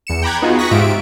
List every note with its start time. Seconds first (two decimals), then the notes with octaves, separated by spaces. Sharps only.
0.07 E2 C#7 E7
0.22 G5 A#5 B5 D6 F#6 G#6
0.42 B3 D#4 F4 F#4 G#4
0.59 C#6 D#6 F#6 A#6 B6
0.71 G#2 F4 G4 E5 D7